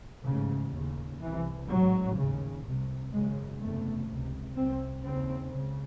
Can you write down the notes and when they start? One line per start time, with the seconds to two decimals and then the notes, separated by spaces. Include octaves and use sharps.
0.24 A1 G#2 C#3
0.72 D#2 C#3
1.20 C2 C3 E3
1.68 A1 G#2 F#3
2.16 D#2 C#3
2.64 C2 C3
3.12 G#1 F#2 C#3 G#3
3.60 F#1 E2 C3 A3
4.08 C#2 C3
4.56 C2 C3 C4
5.03 D#2 C#3 C4
5.51 C#2 C#3